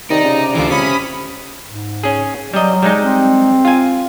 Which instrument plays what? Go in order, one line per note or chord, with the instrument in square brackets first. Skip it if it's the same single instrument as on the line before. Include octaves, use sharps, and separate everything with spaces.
[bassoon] C3 [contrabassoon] D#3 [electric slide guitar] D#4 [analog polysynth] D5 A#5
[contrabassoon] C#3
[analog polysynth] D2 D3 D6 [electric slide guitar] E3 F4
[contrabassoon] C#2 [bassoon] C3 [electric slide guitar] C#4 [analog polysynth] B5 D#6 B6
[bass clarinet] G#2
[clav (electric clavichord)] C#4 G#4
[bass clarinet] F#3 [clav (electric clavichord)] G3 D#5
[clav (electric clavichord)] G3 G#3 D#4
[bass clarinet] C4
[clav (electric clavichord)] F4 G#5